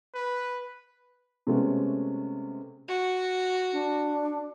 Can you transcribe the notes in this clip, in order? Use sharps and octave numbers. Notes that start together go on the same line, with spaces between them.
B4
C3 G#3 A3 B3 C#4
F#4
D4